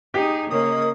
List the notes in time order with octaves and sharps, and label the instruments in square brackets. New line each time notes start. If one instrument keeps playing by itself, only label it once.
[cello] D#4 G#4 [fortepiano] G4
[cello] C#3 A#3 [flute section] A#4 C#5 D#5 [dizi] D#6